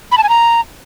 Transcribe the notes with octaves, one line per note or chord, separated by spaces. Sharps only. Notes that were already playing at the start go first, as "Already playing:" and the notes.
B5
A5
G#5
A#5